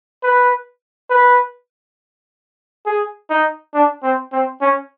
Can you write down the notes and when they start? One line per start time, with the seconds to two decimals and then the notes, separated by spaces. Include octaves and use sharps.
0.23 B4
1.10 B4
2.86 G#4
3.30 D#4
3.74 D4
4.03 C4
4.33 C4
4.62 C#4